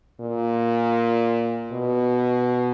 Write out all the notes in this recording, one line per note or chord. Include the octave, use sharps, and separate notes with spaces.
A#2
B2